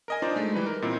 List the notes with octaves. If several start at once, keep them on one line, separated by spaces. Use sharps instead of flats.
A#4 D#5 G#5
D4 D#4 F4 C5 D5
G#3 A3
E3 G3 D#4 B4
A#4
A#2 C4 D#4 E4